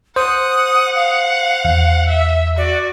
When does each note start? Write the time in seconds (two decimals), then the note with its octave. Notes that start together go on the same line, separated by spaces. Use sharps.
0.16 C5 F#5 D#6
0.95 F5
1.65 E2
2.09 E5
2.57 F#4 D5